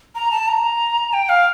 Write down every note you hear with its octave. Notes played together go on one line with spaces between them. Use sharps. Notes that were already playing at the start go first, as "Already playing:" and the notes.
A#5
A5
A#5
G5
F5